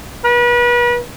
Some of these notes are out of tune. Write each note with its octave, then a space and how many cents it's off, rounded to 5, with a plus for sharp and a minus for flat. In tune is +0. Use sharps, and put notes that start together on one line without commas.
B4 -35